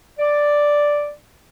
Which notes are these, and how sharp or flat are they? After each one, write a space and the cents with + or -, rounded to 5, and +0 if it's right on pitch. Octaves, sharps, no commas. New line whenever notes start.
D5 +0